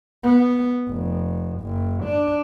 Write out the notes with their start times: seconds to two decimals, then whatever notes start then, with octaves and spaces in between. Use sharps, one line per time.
0.24 B3
0.88 F1
1.60 F#1
2.04 D4